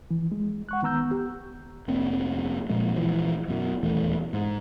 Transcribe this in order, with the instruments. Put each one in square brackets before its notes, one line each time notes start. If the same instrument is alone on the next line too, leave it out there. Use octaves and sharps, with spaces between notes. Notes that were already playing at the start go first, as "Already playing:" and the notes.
[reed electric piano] E3
G#3
F#5 C#6 F#6
D#3 B3 A#5 E6 G6
G4
[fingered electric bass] F1 A#3 C4
A#2 F3 G#3 A#3
A#1 E3 F3
F#2 B2
D#1 E2 E3 A3
G#2